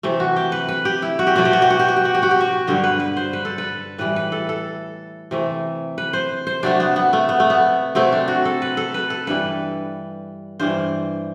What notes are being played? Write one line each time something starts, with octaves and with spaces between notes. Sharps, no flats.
C3 E3 A3
F#4
G4
B4
B4
G4
E4
F#4
G4
B2 F#3 A3 F#4
G4
F#4
G4
F#4
G4
F#4
G4
F#4
G4
F#4
G4
F#4
G2 D3 F#3 G4
B4
B4
C5
B4
A4
B4
A2 E3 G3 B4
B4
A4
A4
C3 E3 A3
B4
C5
C5
C3 F#3 A3 D4
B3
B3
A3
B3
A3
B3
C3 F#3 A3 C4
D4
F#4
A4
B4
A4
B4
A4
G2 E3 G3 B4
G2 E3 G3 C5